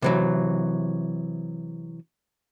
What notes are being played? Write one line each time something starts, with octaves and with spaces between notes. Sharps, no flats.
C3 E3 F#3